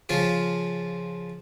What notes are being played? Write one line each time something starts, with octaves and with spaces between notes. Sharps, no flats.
C#3 F3 F4